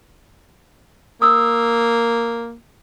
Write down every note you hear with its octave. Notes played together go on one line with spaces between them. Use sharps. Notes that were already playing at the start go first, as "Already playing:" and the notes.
A#3 D#6 E6